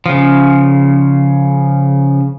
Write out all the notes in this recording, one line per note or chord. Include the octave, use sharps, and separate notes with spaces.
C#3 F3